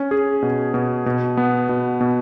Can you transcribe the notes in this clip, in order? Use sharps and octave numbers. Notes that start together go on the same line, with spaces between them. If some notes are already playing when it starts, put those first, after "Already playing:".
Already playing: C#4
G#4
B2
B2
B2
B3
B2
B2